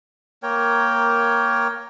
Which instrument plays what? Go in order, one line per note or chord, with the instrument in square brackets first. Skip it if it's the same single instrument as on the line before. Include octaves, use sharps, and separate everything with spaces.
[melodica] A#3 A#4 C#5 G5